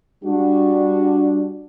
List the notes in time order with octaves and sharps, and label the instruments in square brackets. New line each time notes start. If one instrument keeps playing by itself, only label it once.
[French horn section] G3 D4 F#4